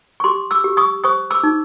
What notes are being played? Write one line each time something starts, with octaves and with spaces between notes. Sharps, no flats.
C#6
G4 C6 D6
D6 E6
G4
C#6 D#6
C5 C#6 D#6
D6 E6
D#4